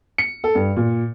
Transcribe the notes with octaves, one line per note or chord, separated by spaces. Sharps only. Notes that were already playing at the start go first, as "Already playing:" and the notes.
C#7
A4
G2
A#2